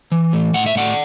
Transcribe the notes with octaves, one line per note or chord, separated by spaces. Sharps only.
E3
A2
A2 F#5
E5
A2 D5 F#5